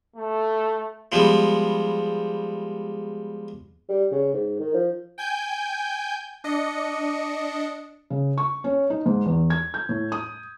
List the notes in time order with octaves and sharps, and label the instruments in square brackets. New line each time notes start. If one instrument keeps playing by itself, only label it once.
[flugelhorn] A3
[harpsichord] F3 G3 G#3 B3
[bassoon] G3
C#3
G#2
D#3
F3
[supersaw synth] G5 G#5 G6
D4 D#5 C#7
[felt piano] C#3
C#6
C#4
D#4
G#2
E2
G#6
G6
A2
D#6